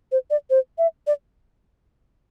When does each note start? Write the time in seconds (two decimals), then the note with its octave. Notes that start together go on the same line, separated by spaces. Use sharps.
0.12 C5
0.31 D5
0.50 C5
0.78 E5
1.07 D5